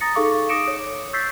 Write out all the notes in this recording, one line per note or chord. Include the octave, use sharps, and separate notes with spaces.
A#5 D#6 A6 A#6 C#7
D#4 G#4 A4 F5 C#6 D6
D6 D#6 A#6 C#7 D7 E7
C#5
C#6 E6 G6 A6 B6 C7